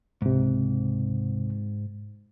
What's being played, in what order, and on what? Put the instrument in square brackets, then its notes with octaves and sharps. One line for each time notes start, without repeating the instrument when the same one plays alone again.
[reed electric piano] C#2 C3 [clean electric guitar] G#2